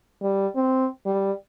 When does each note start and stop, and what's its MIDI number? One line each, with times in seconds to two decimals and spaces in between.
0.22 0.47 55
0.55 0.86 60
1.06 1.32 55